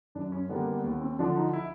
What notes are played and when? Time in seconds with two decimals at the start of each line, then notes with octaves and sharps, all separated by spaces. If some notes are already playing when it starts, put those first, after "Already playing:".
0.15 F#2 D4
0.32 C#4
0.49 D3 G3 A#3 B3
0.68 B3
0.84 D#2 B3
1.01 C4
1.19 D3 F3 D4
1.37 D#4
1.53 E4